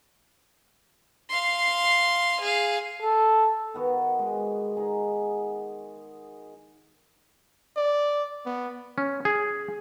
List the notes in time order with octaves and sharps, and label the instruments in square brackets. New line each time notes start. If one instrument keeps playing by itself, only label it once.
[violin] F5 C6
G#4 F5
[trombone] A4
[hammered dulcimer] D#3 B3 F#4
G#3
D#4 G#4
[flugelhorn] D5
B3
[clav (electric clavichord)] C#4
G#4